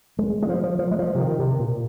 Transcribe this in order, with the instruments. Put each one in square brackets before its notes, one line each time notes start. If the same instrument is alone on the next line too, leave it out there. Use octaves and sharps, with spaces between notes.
[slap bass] G#3
G#3
F3
F3
F3
G#3
F3
C3
D#3
C3
A#2